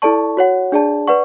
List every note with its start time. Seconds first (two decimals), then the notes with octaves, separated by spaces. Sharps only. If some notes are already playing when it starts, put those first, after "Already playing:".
0.02 E4 A4 D5 A5 C#6
0.37 F#4 C#5 F#5
0.72 D4 G#4 D5 A5
1.07 B4 D5 F#5 C#6